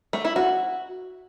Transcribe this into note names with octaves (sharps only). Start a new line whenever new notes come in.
A3
E4
F#4